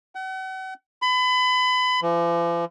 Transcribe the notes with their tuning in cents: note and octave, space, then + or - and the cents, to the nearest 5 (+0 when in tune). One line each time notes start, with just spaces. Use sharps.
F#5 +40
B5 +30
F3 -45